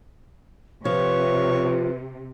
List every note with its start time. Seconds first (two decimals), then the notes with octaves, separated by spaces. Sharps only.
0.85 C3 F3 B4 C#5